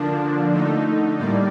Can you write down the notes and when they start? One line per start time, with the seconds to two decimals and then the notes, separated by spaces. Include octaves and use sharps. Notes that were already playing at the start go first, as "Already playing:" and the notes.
Already playing: D3 F3 A#3 D4
0.53 D3 A3 D#4
1.18 A2 G3 A#3 D5